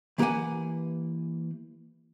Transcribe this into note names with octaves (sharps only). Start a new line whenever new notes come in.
E3 A#3 G4 B4 F#5 G#5